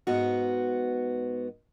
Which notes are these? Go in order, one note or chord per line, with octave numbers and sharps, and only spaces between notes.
G#2 B3 F#4